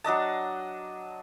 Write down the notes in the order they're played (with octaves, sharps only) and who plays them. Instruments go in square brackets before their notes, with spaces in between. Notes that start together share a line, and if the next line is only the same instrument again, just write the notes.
[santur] F#3 D4 D#5 A5